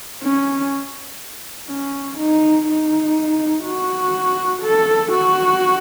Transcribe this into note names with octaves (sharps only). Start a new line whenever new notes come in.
C#4
C#4
D#4
D#4
F#4
A4
F#4